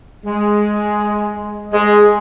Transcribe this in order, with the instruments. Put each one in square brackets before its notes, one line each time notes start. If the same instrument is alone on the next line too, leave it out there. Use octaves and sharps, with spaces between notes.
[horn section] G#3
G#3